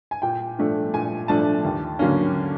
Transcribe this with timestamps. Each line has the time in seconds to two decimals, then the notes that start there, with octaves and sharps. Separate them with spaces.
0.11 G#5
0.22 A#2 G5
0.58 F3 A3 D4
0.94 A#2 G#5
1.28 F3 A3 D4 A5
1.65 D#2
1.99 D3 F#3 A#3 C#4